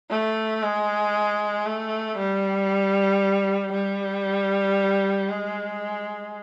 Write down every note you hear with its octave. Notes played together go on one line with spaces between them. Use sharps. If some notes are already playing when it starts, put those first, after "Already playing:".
A3
G#3
A3
G3
G3
G#3